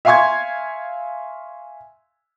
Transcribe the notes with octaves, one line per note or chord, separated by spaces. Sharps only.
E5 F5 G#5 C6 C#6 G#6